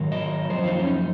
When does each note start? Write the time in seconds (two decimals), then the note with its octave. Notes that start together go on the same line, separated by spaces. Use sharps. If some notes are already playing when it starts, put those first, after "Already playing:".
Already playing: G#2 D#3 F#3
0.12 D#5
0.49 F#2 F3 C5
0.64 F4
0.68 D#4
0.79 C#4
0.87 D#4